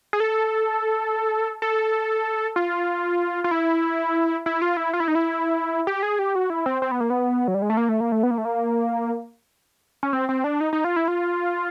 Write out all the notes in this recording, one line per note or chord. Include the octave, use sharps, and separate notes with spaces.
G#4
A4
A4
F4
F4
E4
E4
F4
E4
F4
E4
D#4
E4
G4
G#4
G4
F#4
E4
C4
C4
B3
A#3
B3
F#3
G3
G#3
A3
A#3
A3
A#3
A3
B3
A#3
A3
A#3
C#4
C4
C4
D4
D#4
D#4
F4
E4
F4